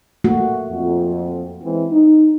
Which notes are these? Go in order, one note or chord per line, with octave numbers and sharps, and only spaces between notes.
A3 A#3 F#4
F2
E3 G#3 C4
D#4